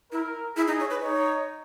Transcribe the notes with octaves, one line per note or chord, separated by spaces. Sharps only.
E4 A#4
E4 G#4
D#4
C#5
B4
D#4 C#5